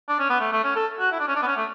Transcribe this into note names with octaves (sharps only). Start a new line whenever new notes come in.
D4
C#4
B3
A3
A3
C#4
A4
F#4
E4
D4
C#4
D4
B3
C#4
A3